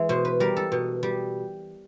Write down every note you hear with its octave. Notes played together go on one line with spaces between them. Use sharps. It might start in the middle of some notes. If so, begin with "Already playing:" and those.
Already playing: E3 G#3
B2 C5
B4
G3 A#4
A4
B2
G3